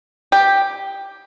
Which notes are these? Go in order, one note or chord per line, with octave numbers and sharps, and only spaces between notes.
G4